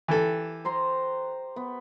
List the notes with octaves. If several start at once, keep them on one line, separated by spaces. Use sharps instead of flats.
E3 G4 A4
C5 A#5 C6
B3